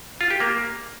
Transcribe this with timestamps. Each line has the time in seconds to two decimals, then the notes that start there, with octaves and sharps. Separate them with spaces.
0.21 F4
0.30 G4
0.40 A#3